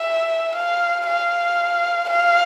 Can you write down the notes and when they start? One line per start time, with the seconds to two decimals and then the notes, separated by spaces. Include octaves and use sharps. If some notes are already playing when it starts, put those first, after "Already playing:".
Already playing: E5
0.55 F5
1.06 F5
2.09 F5